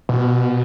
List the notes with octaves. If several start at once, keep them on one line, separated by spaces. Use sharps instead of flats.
B2